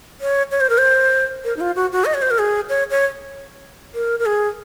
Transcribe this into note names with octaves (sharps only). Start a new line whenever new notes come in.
C#5
C#5
C5
A#4
C5
A#4
D#4
F4
F#4
F#4
D#5
C#5
C5
A#4
G#4
C#5
C#5
A#4
A#4
G#4